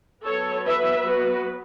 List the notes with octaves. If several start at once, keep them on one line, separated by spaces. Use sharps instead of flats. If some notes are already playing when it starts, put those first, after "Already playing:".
F#3 B3 A4 C#5
B4 E5
F#4 B4